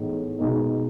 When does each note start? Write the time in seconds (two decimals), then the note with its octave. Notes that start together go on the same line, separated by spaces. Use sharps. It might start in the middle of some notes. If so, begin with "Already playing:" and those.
Already playing: A2 E3 G#3 B3 D#4
0.39 B2 G#3 D#4